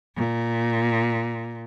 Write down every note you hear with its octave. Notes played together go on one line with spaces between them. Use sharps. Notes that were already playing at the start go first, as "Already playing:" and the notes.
A#2